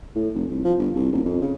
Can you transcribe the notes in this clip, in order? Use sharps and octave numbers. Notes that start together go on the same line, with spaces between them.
A2
F1
C2
F3
G1
C2
D#1
F2
C#3